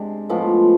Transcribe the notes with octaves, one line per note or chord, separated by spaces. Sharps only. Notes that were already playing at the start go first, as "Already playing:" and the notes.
Already playing: C3 G#3 D4
A2 F3 G#3 B3